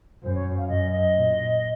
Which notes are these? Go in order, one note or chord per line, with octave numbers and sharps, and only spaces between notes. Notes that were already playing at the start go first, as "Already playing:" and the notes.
F#2 C5
C#5
F5
F#2 D#5
D#5
A#2